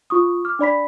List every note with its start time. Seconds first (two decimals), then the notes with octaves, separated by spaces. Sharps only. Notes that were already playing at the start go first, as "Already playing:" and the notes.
0.10 F4 C#6 D#6
0.45 D6 F6
0.59 D4 D5 B5 B6